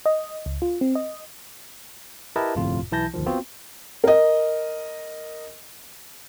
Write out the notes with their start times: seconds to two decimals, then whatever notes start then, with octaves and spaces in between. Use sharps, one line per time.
0.06 D#5
0.46 C#2
0.62 F4
0.81 C4
0.95 D#5
2.36 E4 G4 A#4 B4 D#5 A5
2.55 G1 F2 A2 C3 F4
2.92 B1 E3 E4 A5 G6 A#6
3.14 G1 D2 D#3 F3
3.26 B3 C4 F4 F#4
4.04 A#4 D#5